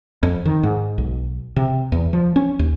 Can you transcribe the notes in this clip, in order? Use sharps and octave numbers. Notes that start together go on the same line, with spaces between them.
F2
D#3
G#2
B1
C3
E2
F3
C#4
D#2